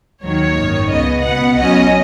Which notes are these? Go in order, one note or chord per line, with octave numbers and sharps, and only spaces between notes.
D#2 D#3 F#3 C#5
G#1 F#2 D#3
C#2 C#3 B3 D#5
C#2 B2 B3 F#5
B1 B2 F#3 C#4 D#5